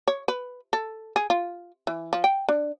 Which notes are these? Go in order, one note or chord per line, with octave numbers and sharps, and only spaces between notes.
C#5
B4
A4
G#4
F4
E3
F3
G5
D4